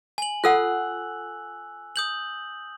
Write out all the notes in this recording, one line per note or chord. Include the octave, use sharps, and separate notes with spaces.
G#5 F#7
F4 A4 F#5 E6 F#6
D#6 G6 F#7